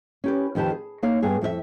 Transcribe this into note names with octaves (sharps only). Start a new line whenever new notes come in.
C#4 G4 B4
F2 D#3 G4 B4 A5
G#4
A#3 D#4 C#5 F5
G2 B3 G#4
F2 F#4 E5